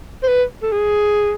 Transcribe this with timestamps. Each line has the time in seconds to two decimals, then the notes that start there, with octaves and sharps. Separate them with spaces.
0.23 C5
0.28 B4
0.63 A4
0.72 G#4